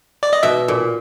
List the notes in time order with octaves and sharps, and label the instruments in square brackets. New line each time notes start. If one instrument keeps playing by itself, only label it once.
[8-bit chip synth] D5
D#5
[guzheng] B2 [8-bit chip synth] E5
[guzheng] A#2